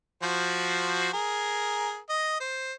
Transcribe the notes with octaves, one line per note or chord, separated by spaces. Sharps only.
F3 F#4 C5
G#4 A#4
D#5
C5